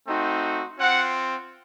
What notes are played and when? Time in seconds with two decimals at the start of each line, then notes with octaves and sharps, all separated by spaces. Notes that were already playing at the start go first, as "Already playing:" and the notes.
0.08 A3 C4 D#4 F#4
0.79 C4 F4 F#5